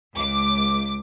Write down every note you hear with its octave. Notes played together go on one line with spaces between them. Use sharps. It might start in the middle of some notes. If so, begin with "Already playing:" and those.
C#2 D6